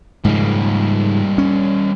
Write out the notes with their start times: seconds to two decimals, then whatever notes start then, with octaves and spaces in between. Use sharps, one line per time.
0.25 G#2 C#3 F3 G3 A#3
1.38 C#4